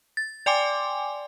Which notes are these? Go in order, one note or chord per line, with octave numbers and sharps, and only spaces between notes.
A6
D5 G5 G#5 C6 D6